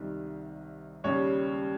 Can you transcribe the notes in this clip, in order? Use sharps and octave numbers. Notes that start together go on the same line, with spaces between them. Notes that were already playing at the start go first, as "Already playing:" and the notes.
Already playing: C2 C3 D#3 G3
D#2 C#3 G3 C#5